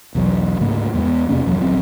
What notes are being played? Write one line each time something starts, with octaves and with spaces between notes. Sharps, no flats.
B1 E2 F#3
D2 G#2 C#3 A#3
E2 G#3 B3
E2 C3 A#3 C#4
D#1 F2 F#3
D1 A#1 F#3 C4